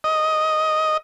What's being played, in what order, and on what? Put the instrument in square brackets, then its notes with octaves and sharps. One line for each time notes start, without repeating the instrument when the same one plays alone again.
[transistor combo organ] D#5